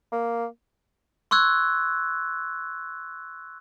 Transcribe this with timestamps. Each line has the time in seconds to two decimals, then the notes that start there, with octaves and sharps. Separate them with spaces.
0.12 A#3
1.31 C6 C#6 E6 F#6 G#6